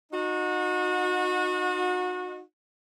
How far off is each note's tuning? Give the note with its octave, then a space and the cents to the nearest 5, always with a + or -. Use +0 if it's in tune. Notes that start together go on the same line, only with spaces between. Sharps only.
D#4 -15 F#4 -30